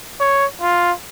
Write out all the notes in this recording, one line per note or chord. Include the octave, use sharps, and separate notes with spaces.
C#5
F4